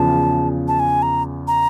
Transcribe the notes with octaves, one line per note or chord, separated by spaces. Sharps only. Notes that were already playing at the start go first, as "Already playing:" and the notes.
Already playing: E2 C#3 F3 A5
A5
G#5
A#5
A#5